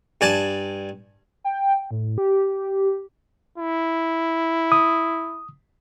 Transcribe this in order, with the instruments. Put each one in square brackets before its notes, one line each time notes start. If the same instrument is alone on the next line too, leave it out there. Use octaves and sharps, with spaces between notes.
[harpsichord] G2 D5 G#5 A5
[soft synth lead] G5
A2
G4
[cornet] E4
[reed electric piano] D#6